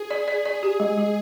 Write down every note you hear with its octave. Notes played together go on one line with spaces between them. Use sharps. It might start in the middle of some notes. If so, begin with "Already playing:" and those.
Already playing: G#4
D5
D5
G#4 D5
G4
G#3
G#3